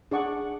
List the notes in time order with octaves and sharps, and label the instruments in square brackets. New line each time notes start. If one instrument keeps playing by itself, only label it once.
[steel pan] D4 G#4 D5 F#5 C#6